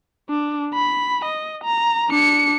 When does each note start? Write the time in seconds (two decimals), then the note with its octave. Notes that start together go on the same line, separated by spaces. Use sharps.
0.30 D4
0.74 B5
1.25 D#5
1.64 A#5
2.10 D4 C#7